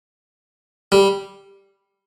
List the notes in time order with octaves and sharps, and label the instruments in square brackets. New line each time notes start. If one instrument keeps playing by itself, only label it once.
[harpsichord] G3